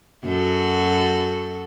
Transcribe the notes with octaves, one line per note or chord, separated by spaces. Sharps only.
F#2 F#4 A4